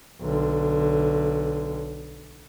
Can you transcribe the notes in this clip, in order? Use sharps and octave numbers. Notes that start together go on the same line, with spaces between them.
B1 D3